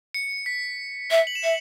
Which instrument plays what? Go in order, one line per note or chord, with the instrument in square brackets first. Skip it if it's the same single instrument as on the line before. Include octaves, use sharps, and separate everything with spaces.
[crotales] C#7
B6
[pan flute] E5
[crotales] F#7
E7
[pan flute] E5 [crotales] C#7